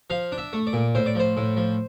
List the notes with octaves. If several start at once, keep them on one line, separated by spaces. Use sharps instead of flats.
F3 F5
D4
E5
A3
D5
A#2
A2 C5
D5
F3 C5
A2
F3